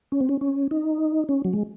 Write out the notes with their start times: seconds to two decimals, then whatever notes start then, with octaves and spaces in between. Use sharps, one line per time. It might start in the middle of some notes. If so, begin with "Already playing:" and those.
0.12 C#4
0.21 C4
0.29 C#4
0.41 C#4
0.71 D#4
1.29 C#4
1.45 F#3
1.53 G#3